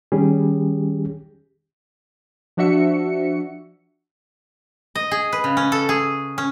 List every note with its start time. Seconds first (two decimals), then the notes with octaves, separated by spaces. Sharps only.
0.12 D#3 G3 C#4 G4 G#4
2.57 F3 D4 F#4 E5 C#7
4.95 D#5
5.11 G#4
5.33 B4
5.44 C#3
5.57 C#4
5.72 A4
5.89 G#4
6.38 C#4